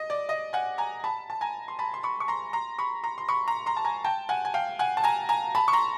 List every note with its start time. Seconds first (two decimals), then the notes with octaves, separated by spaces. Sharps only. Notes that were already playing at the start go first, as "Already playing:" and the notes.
Already playing: D#5
0.10 D5
0.29 D#5
0.53 F#5 G#5
0.78 G#5 A#5
1.04 A5 B5
1.30 A5
1.41 G#5 A#5
1.68 C6
1.79 A5 B5
1.94 C6
2.03 B5 C#6
2.20 C#6
2.28 A#5 C6
2.53 A#5 C6
2.79 B5 C#6
3.03 A#5 C6
3.18 C6
3.28 B5 C#6
3.48 A#5 C6
3.66 A#5 C6
3.77 A5
3.85 G#5 A#5
4.04 G5 A5
4.29 F#5 G#5
4.45 G#5
4.54 F5 G5
4.79 F#5 G#5
4.97 A5
5.04 G#5 A#5
5.29 G#5 A#5
5.55 A5 B5
5.68 C#6
5.73 A#5 C6